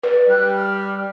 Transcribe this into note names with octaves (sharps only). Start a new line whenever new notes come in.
B4 D5
G3 F#6
F6